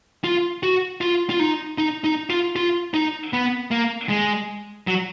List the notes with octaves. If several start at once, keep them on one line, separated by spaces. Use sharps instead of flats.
F4
F#4
F4
F4
D#4
D#4
D#4
F4
F4
D#4
B3
A#3
G#3
F#3